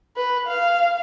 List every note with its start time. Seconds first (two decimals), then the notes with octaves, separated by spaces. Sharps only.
0.17 B4
0.47 F5